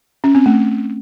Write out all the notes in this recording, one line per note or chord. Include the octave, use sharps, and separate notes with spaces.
C#4
C4
A3